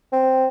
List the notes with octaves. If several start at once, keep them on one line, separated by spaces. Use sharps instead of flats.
C4